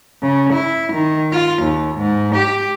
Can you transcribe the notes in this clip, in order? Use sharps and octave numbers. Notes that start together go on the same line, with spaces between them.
C#3
E4
D#3
F4
D#2
G#2
G4